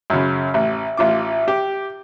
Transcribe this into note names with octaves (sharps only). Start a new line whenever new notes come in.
F#2 C#3
A1
A1 F4 D6
G4